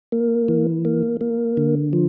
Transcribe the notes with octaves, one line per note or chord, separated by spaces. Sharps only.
A#3
E3
A#3
A#3
D3
F3